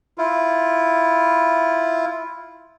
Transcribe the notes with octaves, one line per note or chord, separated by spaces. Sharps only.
E4 F4